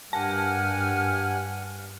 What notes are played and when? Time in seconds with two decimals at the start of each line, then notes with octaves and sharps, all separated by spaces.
0.13 G2 D4 G4 A#4 F#5 G#5 A5 F6